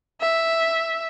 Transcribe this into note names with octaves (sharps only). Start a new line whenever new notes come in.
E5